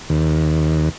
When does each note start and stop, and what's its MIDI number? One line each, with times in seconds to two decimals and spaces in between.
0.10 0.89 39